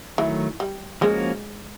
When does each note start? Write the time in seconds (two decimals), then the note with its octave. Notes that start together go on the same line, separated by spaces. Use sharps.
0.18 D#3 E3 F#3 A3
0.60 G3
1.01 F3 G#3 A#3 C#4 F#4